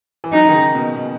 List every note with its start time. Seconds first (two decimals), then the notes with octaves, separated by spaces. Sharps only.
0.24 E3
0.32 F#3 D#4
0.49 D#3
0.53 C#3
0.75 B2
0.96 B2